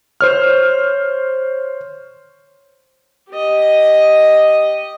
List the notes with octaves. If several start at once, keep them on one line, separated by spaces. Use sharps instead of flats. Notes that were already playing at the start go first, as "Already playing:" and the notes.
C5 C#5 F6
G4 D#5